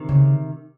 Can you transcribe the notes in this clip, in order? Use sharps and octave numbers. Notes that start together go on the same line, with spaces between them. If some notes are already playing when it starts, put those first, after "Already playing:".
Already playing: C3 D#3
C#3